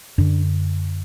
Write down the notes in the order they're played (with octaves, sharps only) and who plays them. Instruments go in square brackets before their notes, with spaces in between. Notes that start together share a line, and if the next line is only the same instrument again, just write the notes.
[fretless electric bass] F#2 D3 D4